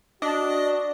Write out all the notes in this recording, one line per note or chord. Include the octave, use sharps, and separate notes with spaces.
D4 F#4 D#5